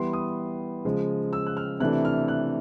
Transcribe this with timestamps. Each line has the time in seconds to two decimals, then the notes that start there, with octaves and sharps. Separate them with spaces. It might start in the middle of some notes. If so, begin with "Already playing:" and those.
Already playing: E3 G3 B3 C6
0.13 D#6
0.85 C#3 F3 G#3
1.33 E6
1.46 F#6
1.57 F6
1.80 C3 E3 A3 D4 F#6
2.05 F6
2.28 F#6